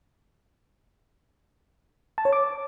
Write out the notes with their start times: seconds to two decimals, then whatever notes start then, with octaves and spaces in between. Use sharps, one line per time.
2.18 A5
2.25 C#5
2.33 D6